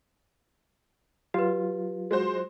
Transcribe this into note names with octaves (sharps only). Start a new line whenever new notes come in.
F#3 F4 G4 B4
G#3 F#4 C5